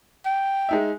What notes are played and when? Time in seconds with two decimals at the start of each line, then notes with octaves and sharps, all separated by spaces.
0.26 G5
0.69 G#3 D#4 E5